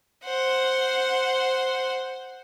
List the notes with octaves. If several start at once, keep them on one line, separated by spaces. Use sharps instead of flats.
C5 F#5